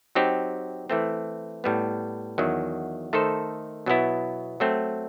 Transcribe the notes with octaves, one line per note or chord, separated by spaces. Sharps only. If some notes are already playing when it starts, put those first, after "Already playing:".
F#3 C4 D#4 G4
E3 A3 C4
A2 G3 B3
E2 D#3 F#3
D#3 A3 D#4 A4 C5
B2 F#3 B3 E4
F#3 A3 C4